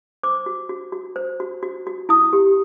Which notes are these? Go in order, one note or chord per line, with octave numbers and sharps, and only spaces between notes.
C5 D6
F#4
F#4
F#4
C5
F#4
F#4
F#4
E4 D#6
G4